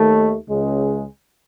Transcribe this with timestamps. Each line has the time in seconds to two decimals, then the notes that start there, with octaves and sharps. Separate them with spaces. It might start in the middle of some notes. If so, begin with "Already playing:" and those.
Already playing: D#2 D#3 A3
0.49 C#2 C#3 G#3